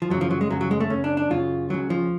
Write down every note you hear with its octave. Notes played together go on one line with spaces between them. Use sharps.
F3
F#2 C#3 F#3
F3
F#3
G#3
F#2 C#3 F#3
F#3
G#3
A3
F#2 C#3 C#4
D4
D4
F#2 C#3 F4
C#2 C#3 F#3
F3